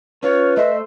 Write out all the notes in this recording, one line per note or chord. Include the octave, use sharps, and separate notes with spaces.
C#4 F4 B4 C#5
A3 C5 D#5 E5 E6